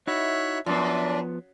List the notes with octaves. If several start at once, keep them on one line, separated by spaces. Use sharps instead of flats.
D#4 E4 F#4 C#5 E5 F#6
F#2 F3 B3 D4